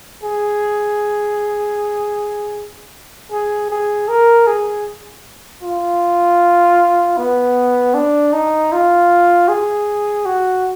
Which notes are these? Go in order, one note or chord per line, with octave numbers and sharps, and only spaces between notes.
G#4
G#4
G#4
A#4
G#4
F4
B3
D4
D#4
F4
G#4
F#4